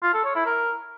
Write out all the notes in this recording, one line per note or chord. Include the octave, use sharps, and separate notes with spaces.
F4
A4
C#5
E4
A#4